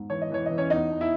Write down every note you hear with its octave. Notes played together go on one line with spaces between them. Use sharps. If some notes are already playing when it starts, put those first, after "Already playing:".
Already playing: G#2
E3 C#5
D#5
E3 C#5
E3 D#5
C#4 C#5
E2 D#4 D#5
E2
E4 E5